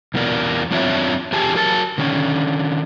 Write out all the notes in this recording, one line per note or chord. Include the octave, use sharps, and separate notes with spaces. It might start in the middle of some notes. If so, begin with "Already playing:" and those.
E2 E3 B3 A#4 D5
F#2 C4 D4 F4 C#5 E5
E2 C4 G4 G#4 G#5 A5
F#3 A#4 A5
D3 D#3 C#4